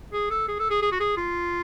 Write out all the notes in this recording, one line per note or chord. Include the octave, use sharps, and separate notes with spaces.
G#4
A4
G#4
A4
G#4
G#4
F#4
G#4
F4